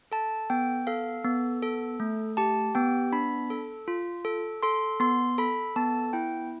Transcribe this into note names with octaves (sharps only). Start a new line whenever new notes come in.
A4 A5
B3 G5
A4 F5
B3
A4
A3
G4 A5
B3 G5
D4 B5
A4
F4
A4
A4 C6
B3 C6
A4 B5
B3 A5
E4 G5